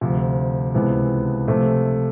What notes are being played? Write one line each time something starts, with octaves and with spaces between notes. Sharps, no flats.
D2 C3 F3
C#2 C3 E3 G#3 B3
C3 F3 A3